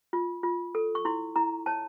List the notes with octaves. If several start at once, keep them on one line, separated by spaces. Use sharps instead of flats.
F4
F4
A4
C#6
E4 C6
E4 A#5
C#5 A5